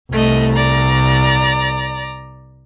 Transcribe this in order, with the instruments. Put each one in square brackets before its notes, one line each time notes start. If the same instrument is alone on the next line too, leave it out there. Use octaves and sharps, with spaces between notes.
[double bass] C2 [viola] A3 D#5
[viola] D5 A#5